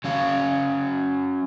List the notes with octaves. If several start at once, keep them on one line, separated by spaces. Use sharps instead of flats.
F#3 C#4 F5